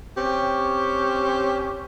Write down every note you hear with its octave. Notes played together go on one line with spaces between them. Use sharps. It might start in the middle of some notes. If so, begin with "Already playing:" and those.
C4 C#4 G4